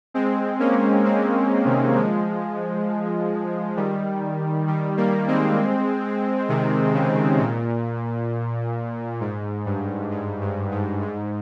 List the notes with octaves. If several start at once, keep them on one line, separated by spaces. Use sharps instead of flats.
G#3 C4
A#3 C#4
G#3 C4
C3 D#3
F3 G#3
D#3 G3
D#3 G3
G3 A#3
G#3 C4
C3 D#3
C#3
A#2
G#2
G2
G#2
G2
G#2
G#2